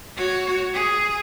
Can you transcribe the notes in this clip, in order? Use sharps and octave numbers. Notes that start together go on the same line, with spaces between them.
F#4 C#5
G#4